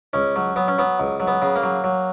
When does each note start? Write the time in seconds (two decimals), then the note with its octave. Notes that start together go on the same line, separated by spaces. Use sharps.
0.13 C#2 C#4
0.36 F#3
0.56 F#3 B3
0.68 C#4
0.78 F#3 B3
1.00 C#2
1.20 F#3
1.27 B3
1.42 C#3
1.56 A#3
1.64 F#3
1.84 F#3